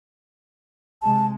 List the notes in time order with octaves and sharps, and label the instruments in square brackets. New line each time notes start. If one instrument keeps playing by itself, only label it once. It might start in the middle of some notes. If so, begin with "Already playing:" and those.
[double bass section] C3 G#3 [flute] A5